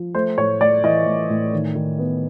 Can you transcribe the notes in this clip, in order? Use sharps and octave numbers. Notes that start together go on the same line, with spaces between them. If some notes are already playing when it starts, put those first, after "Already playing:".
Already playing: F3
A3 C5
A2 C#5
A3 D5
E3 D#5
A2
A2
D#3
D#3
B3